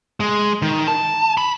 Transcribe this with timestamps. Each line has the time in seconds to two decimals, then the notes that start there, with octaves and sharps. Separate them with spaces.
0.20 G#3
0.62 D#3
0.88 A5
1.38 B5